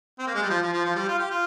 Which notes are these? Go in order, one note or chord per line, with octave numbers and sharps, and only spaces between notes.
C4
A#3
G#3
G3
F3
F3
F3
F3
G3
F4
G4
F4